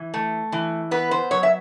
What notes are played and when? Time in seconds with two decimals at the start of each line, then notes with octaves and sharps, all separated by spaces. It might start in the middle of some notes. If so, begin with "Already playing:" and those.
Already playing: E3
0.14 A3
0.52 E3
0.91 B3 B4
1.11 C5
1.31 F#3 C#5
1.43 E5